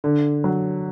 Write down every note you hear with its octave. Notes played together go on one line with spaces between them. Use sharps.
D3
F#3